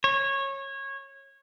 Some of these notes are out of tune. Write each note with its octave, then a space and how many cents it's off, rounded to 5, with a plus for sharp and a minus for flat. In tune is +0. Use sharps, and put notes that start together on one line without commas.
C#5 -20